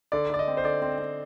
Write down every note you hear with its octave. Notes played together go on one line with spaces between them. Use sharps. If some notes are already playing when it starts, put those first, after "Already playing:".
D3 D5
D3 D5
D#5
C4
C5
D3 D5
C4
C4